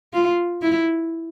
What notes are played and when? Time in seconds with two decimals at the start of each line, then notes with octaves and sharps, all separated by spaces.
0.13 F4
0.62 E4